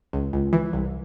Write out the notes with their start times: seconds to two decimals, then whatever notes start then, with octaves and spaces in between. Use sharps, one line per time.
0.13 C#2
0.33 C#2
0.53 E3
0.73 C2